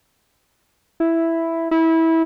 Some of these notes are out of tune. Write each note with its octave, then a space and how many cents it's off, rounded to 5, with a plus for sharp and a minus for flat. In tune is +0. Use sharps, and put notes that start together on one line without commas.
E4 +0
E4 -20